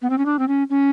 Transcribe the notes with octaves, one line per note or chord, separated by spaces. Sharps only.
B3
C4
C#4
D4
C4
C#4
C#4